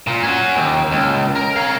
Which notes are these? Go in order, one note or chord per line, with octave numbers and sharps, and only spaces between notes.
A#2
C#4 F#4
D#2
C#2
A#4
C#5 F5